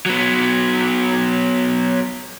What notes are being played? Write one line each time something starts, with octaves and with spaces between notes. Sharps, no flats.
F#3 B3